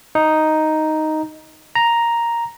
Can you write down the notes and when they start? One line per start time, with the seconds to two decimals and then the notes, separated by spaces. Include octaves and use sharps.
0.15 D#4
1.75 A#5